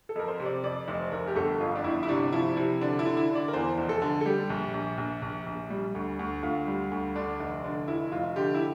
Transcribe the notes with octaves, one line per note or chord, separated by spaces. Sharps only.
A4
F2 A#4
C5
C3
D5
F2 D5
F1 C5
F1 A#4
G4
G1 A4
F2 F4
D4
G1 E4
E4
C3 D4
F3 E4
C3 E4
D3 D4
E4
D3
E4
D3
D5
A#4
E2 C5
F1
A4
D3
A4
G3 G4
A#1
A#1
A#1
A#1
A#1
G3
D2
D2
D2 F4
G3
D2
D3 D4
F1
D3
F1 E4
F1 F4
D3 G4
E4